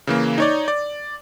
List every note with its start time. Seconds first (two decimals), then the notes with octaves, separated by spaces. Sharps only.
0.07 C#3 E3 A#3
0.38 D#4 C#5 D5
0.68 D5